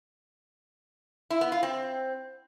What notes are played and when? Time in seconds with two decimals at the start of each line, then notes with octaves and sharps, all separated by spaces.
1.30 E4
1.41 B3
1.52 F4
1.63 C4